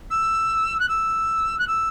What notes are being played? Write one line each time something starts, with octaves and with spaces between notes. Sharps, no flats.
E6
F#6
E6
F#6
E6